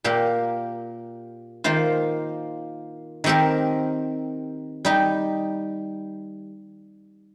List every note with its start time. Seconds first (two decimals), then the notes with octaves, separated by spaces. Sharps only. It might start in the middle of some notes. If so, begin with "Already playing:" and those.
0.04 A#2 A#3 G4 A#4
1.64 D#3 A#3 F4 C5
3.24 D#3 C4 G4 A#4
4.85 G3 D#4 G4